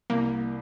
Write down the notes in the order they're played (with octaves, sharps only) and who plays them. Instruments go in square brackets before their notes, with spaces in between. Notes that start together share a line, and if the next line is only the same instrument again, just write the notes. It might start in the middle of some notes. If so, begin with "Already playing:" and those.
[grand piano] C2 [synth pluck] A#3